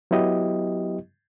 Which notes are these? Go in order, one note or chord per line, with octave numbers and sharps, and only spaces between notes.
F#3 B3 E4 G4 D#5